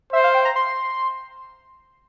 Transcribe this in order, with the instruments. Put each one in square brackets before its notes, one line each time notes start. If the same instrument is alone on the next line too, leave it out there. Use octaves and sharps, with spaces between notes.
[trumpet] C5 [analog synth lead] E5
[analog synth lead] F5
G5
A#5
C6